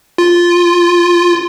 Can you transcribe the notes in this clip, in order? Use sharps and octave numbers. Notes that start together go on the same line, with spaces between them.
F4